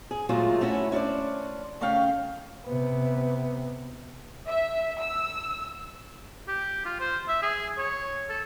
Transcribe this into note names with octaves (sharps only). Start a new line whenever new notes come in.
G#4
A#2 F#3 G#3 A3 F4 G#4
A3 C#4 E4 F#4
C#4 D4 G4 C5 D5
C#3 A3 C#4 F5 G5
C3 B3
E5
E6
G4
F4
C5
E5
G#4
C#5
A4